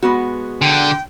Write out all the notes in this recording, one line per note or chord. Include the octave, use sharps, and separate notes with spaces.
G#3 B3 F#4
D3 G5